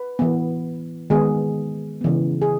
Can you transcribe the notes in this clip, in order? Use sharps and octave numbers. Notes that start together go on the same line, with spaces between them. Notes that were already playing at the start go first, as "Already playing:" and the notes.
Already playing: B4
E3 B3
D#3 G#3 B3 G#4
C#3 E3 B3
G#4